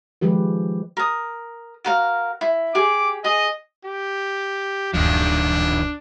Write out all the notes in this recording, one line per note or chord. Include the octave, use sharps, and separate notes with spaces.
D#3 F3 G#3 G4 B4
A#4 D#6
F#4 A#4 F5
E4
G4 G#4 D6
G#4 D#5
G4
D1 F#2 D#3 F3 D4